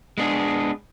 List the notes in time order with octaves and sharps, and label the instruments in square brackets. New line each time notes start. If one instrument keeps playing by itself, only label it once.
[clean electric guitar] G#3 B3 D4 G#4